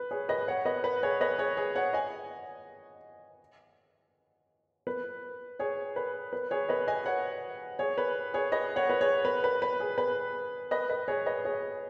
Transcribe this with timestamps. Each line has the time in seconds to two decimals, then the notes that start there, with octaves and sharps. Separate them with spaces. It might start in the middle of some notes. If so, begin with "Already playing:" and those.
Already playing: B4
0.11 G#4 C#5
0.29 B4 D#5
0.48 C#5 F#5
0.65 B4 D#5
0.84 B4
1.03 G#4 C#5
1.21 B4 D#5
1.38 G#4 C#5
1.57 G#4
1.76 C#5 F#5
1.93 D#5 G#5
4.87 B4
5.59 G#4 C#5
5.96 B4
6.33 B4
6.51 G#4 C#5
6.69 B4 D#5
6.87 D#5 G#5
7.06 C#5 F#5
7.79 G#4 C#5
7.98 B4
8.34 G#4 C#5
8.52 B4 D#5
8.76 C#5 F#5
8.90 B4
9.01 G#4 C#5
9.25 B4
9.44 B4
9.62 B4
9.80 G#4
9.98 B4
10.71 B4 D#5
10.90 B4 D#5
11.08 G#4 C#5
11.26 B4 D#5
11.45 G#4 C#5